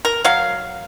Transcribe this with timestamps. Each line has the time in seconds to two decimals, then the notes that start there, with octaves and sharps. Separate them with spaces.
0.05 A#4
0.25 F#3 F5